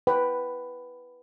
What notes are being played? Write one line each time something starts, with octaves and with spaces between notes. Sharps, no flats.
B4 G5